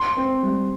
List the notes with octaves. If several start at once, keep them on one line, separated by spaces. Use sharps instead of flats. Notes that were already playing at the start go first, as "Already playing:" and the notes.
Already playing: C6
C4
G3